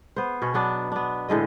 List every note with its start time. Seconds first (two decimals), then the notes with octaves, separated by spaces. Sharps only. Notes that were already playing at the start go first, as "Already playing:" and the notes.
0.16 B3 C5
0.42 B2 C#4 C#5
0.54 F#3 B3 D4
0.92 B3 D4
1.29 A2 D3 G#3 D#5